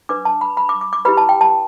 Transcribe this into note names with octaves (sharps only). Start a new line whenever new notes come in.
D4 B4 D6
A5
B5
B5
D6
D6
D6
E4 G4 B4 B5
A5
G5
A5